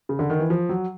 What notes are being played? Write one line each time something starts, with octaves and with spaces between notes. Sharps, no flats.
C#3
D3
D#3
E3
F3
F#3